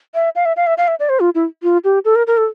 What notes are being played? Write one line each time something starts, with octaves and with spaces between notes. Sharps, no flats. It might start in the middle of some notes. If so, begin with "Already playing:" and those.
E5
F5
E5
F5
E5
F5
E5
D5
C5
F4
E4
F4
G4
A4
A#4
A#4
A4